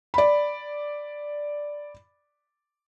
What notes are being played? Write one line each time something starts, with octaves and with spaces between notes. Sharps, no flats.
D5 B5